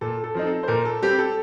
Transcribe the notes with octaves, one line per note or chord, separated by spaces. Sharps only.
A#2 A4
A4
F3 C4 D#4
A4
C5
A#2 A#4
A4
G3 C4 G4
A4